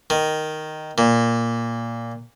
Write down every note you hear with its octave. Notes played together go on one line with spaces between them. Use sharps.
D#3
A#2